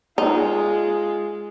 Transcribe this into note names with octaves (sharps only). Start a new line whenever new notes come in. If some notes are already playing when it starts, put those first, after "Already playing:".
G#3 D#4 F4